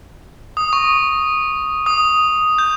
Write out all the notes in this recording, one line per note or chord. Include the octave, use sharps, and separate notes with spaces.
D#6
C#6
D#6
G6